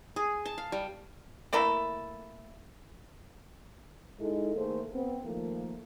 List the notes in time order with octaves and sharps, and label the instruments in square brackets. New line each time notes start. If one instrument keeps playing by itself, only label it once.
[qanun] G#4
A5
F5
G3
[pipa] A3 A#3 E4 A4
[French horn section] G#3 D#4 E4 A4
D#3 A3 A#3 G#4 C5
C3 B3 C4
D#3 F3 A3 A#3